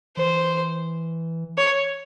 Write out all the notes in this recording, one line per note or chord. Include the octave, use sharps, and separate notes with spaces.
E3 C5
C#5